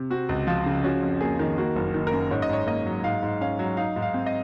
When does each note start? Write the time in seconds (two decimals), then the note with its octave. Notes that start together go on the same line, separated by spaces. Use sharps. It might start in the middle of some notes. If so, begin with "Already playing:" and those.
Already playing: C3
0.10 C4 F#4
0.29 C#2
0.47 F3 F4
0.66 C#3
0.84 C#4 F#4
1.02 F2
1.21 A#3 G#4
1.39 D#3
1.58 A#3 F#4
1.76 F#1
1.94 D#3
2.07 A#4
2.12 F#2
2.31 G#2 C#5
2.42 D#5
2.49 G#2 C#5
2.67 A#3 D#5
2.86 F#3
3.04 G#2 F5
3.23 G#2
3.41 C#4 F5
3.59 F#3
3.77 D#4 F5
3.96 G#2
4.02 F5
4.14 C4
4.26 D#5